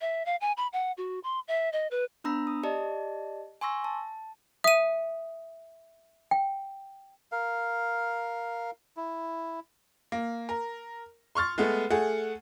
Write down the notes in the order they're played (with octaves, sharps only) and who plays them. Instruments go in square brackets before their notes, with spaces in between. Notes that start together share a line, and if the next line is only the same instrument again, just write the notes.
[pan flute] E5
F5
G#5
B5
F#5
F#4
C6
E5
D#5
B4
[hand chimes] B3 D4 A#5 B5 E6 A#6
D#6
G4 D5 D#5 A5
G#5 C6 C#6 E6 A#6
A5
[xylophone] E5 D#7 [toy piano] D#6
[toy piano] G5
[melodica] A#4 F5
E4
[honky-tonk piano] A#3
A#4
C6 C#6 F6 A6
G#3 A3 B3
A3 G#4 F#5